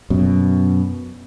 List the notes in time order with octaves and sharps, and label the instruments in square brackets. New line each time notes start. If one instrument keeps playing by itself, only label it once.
[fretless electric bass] F#2 B2